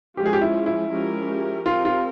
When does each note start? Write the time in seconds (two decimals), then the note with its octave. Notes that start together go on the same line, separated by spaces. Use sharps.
0.16 F3 G#3 C#4 F4 G4
0.26 G#4
0.33 G4
0.41 E4
0.66 E4
0.91 F3 G#3 C#4 G4 A#4
1.66 C4 F4 G4 A#4
1.85 F4